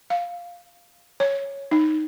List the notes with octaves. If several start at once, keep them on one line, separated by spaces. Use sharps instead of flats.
F5
C#5
D#4